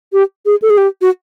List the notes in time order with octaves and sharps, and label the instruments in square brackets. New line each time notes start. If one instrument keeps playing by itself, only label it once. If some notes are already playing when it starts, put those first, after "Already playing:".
[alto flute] G4
G#4
A4
G#4
G4
F#4